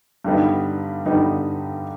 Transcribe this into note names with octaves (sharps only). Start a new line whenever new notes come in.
G2 D3 G3 B3 D#4
G2 D3 G3 B3 D#4